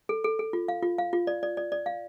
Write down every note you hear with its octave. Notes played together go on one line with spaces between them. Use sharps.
A4
A4
A4
F4
F5
F4
F5
F4
D5
D5
D5
D5
F5